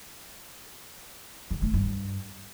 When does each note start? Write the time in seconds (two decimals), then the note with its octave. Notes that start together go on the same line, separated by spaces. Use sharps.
1.51 C#3
1.62 A3
1.74 G2